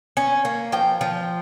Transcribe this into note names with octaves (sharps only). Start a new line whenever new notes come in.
C#4
A#3
F3 G5
F3